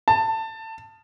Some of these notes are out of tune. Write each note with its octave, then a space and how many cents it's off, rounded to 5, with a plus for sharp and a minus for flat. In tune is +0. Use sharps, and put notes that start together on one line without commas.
A5 +20